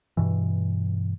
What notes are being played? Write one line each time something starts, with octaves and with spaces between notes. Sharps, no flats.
G2 B2 E3